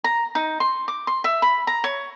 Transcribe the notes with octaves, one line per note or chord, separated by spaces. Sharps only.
A#5
D#4
C6
D6
C6
E5
B5
A#5
C#5